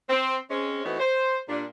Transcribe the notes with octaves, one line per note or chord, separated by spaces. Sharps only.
C4
G#3 C4 C#4
E3 A3 B3 C4 D#4 F#4
C5
A#2 G3 D4